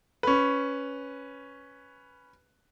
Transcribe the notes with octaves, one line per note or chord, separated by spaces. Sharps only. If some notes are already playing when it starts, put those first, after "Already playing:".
C#4 B4